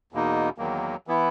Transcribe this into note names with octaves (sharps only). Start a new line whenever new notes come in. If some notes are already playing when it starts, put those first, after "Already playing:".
E2 B2 A#3 D#4
E2 D#3 F#3 A#3
E3 B3 E4